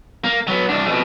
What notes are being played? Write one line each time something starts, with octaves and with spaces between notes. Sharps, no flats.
A#3
F#3 B3
C2 D4
F2 B2